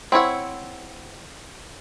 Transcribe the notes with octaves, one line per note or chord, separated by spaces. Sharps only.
C4 E4 C#5 F#5